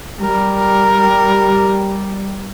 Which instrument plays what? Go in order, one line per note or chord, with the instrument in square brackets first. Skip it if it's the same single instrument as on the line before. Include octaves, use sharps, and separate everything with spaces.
[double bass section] G3 [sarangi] A#4
[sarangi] A#4